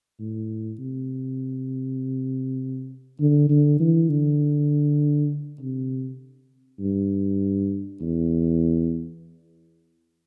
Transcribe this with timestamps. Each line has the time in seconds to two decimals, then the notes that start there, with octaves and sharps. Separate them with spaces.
0.19 A2
0.79 C3
3.20 D3
3.49 D3
3.80 E3
4.09 D3
5.60 C3
6.80 G2
8.00 E2